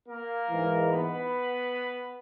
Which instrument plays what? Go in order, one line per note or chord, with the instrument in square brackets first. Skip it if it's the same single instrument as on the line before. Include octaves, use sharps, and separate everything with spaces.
[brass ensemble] A#3 A#4
G#2 E3
B3 B4